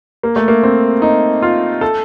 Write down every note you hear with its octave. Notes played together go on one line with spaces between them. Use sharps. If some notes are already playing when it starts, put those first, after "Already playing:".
A#3
A3
A#3
C4
D#4
F4
A4